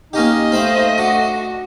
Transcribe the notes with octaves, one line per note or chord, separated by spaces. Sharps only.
A#3 C#4 D#4 G4 D#5
A3 D#4 C5 F5 G5 B5
D4 F#4